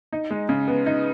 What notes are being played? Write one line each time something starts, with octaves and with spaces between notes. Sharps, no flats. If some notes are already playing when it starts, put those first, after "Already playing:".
D#4
G#3
C#3
B3
D#4